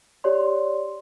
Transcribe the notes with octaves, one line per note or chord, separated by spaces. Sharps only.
G4 C#5 D5 C6